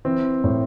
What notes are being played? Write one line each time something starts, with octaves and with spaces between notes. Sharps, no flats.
E3 C4
A2